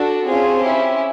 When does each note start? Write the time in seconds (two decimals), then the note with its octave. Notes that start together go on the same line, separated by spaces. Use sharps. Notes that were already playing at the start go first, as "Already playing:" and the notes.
Already playing: D4 F#4 A4
0.26 C4 C#4 F4 G#4 C5
0.63 C#4 E4 G4